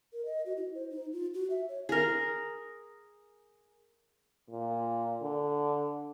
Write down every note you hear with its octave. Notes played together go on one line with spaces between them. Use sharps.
A#4
D#5
F#4
E4
C5
D#4
F4
F#4
E5
C#5
G#4 A#4
A#2
D3